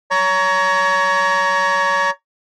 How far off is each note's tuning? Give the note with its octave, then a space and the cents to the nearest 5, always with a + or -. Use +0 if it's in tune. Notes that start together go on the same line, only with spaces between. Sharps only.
C#5 +25 A#5 +0